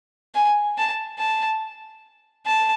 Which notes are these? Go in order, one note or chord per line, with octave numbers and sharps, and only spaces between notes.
G#5
A5
A5
A5